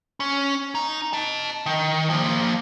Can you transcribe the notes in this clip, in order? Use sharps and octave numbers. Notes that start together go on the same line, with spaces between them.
C#4
D#4
D#5 A5
D#3
F3 A#3